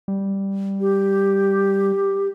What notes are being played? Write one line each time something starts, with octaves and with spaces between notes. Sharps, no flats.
G3
G4